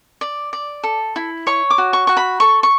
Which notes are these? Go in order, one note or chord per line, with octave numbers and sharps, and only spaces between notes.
D5
D5
A4
E4
C#5 C#6
D6
F#4
C#6
F#4 C#6
B5
A4 C#6
C#6